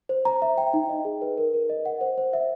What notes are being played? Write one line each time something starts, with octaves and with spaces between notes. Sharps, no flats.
C5
A#5
E5
G5
D#4
D#5
G#4
B4
A#4
A#4
D#5
F#5
C5
C5
E5